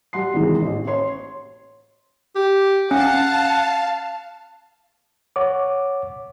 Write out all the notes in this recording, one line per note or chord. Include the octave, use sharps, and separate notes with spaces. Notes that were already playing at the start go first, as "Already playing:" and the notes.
G3 F#5 C6 C7
C3 D#3 E3 G#3
A1
C#5 C6
G4
C#4 F5 F#5 A5
C#5 F#5 D6